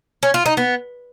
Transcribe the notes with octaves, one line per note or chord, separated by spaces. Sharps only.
C#4
F4
D#4
B3